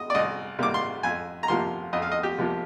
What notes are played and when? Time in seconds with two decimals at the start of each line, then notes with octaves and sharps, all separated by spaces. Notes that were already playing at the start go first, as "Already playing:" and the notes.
Already playing: D#5
0.10 D5
0.14 C2 D#5
0.58 C3 G3 A#3 D6
0.74 C6
1.03 F2 G#5
1.43 A#5
1.48 C3 F3 A#3 C6
1.93 F2 D#5
2.02 F5
2.12 D#5
2.23 G4
2.38 C3 F3 A#3